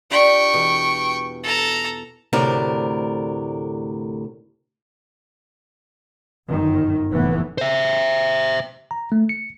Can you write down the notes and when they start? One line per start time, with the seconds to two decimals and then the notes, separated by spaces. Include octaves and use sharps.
0.11 D4 F4 G4 G5 C#6
0.53 E2 B2
1.43 A4 A#5
2.33 D2 A2 C3 D4 A#4
6.49 G1 F#2 D#3
7.11 F1 A2 E3 B3
7.58 C5 E5
8.91 A#5
9.12 A3
9.29 C#7